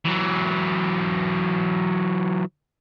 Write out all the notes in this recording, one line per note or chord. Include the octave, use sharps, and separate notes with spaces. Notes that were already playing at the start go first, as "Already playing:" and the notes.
E3 F#3